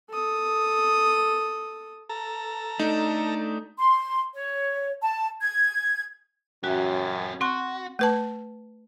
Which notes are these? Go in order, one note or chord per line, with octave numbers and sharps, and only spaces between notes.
A4 D#6
A4 A#5
A3 D4 D#4
C6
C#5
A5
G#6
F#2 C#4 F#4 G4 E5
C4 F#4 C6 C#6 F#6
A3 B4 A5